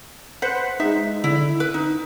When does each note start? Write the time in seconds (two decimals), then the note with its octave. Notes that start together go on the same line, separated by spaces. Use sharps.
0.42 B4 C5 F#5
0.80 G#3 D#4 E5
1.24 D3 E4
1.60 B4
1.74 D#4